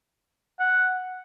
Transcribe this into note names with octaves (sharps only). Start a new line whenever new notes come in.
F#5